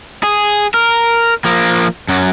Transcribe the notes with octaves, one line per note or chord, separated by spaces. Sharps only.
G#4
A#4
F3 A#3
F#2 F#3